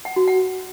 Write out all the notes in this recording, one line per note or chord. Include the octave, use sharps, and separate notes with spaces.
F#5
F#4
F#5